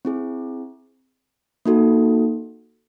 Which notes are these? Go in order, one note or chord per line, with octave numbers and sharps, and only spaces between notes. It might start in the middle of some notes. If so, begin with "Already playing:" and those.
C4 E4 G#4
A#3 D#4 F#4 A4